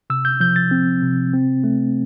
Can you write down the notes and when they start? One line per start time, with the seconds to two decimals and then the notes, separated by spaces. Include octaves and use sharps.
0.10 C3 E6
0.25 G6
0.40 F3 G6
0.56 A6
0.71 C4
1.02 C3
1.33 C4
1.64 A3